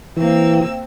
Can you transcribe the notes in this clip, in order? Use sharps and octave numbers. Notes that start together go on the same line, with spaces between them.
E3 A#3 C4 E6